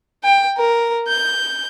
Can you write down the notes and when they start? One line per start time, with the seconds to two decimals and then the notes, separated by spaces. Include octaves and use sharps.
0.24 G5
0.58 A#4
1.08 G6